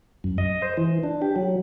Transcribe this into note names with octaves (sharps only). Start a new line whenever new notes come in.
F#2
D#5
C5
E3
D4
G4
F#3